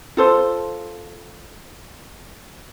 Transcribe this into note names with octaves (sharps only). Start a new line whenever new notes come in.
F4 A4 C5